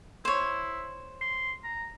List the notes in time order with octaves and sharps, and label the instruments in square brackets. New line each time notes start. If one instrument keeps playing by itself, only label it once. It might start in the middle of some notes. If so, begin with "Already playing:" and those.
[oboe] E4 [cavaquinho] C5 C#5
[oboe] C6
A#5